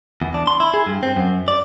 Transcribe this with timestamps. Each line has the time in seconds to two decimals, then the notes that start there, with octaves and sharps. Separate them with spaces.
0.22 E2
0.34 D4
0.47 C6
0.60 E4
0.74 G#4
0.87 G2
1.03 C4
1.16 F#2
1.48 D5